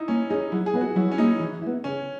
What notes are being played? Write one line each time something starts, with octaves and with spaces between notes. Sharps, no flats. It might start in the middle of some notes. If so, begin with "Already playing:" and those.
Already playing: D#4 E4
A#3 C#4
C#4 D#4 G#4
F#3 E4
G#4
B3 E4 B4 D#5
F#4
F#3 E4
C#4
A#3 D#4 E4 G#4
E3
B3 E4
C#3 C#4